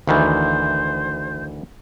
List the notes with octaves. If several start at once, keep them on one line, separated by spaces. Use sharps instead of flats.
D2 D#3 E3 C5